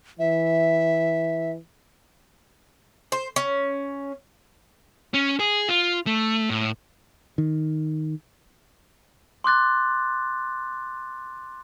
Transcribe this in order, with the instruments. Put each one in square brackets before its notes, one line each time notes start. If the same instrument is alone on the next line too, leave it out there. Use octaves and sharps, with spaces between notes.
[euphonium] E3 [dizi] E5
[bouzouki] C5
C#4
[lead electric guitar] C#4
G#4
F4
A3
A2
[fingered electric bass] D#3
[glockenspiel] C6 D6 F#6 A6